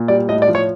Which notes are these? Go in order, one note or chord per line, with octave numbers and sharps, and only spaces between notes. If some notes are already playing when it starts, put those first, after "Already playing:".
Already playing: A#2
G3 D5
A2 D#5
D5
F3
C#5